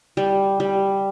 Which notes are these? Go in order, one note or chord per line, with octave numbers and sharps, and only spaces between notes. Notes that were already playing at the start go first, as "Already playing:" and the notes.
G3
G3